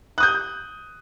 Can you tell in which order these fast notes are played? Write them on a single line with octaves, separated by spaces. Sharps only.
F#6 D#6 G6